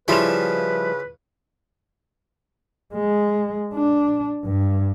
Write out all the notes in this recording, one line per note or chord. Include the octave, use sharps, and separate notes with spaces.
C#3 F3 G3 E4 F4 B4 B5 E7
G#3
D4
G2